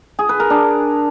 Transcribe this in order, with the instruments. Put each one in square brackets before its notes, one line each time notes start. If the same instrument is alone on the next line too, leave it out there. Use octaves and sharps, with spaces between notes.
[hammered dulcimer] G#4
B4
A#4
D4